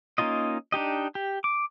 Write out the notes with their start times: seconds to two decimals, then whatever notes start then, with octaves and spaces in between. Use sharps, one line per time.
0.18 A#3 C#4 D#4 F4 D#5
0.72 D4 D#4 G4 D#5
1.15 G4
1.44 D6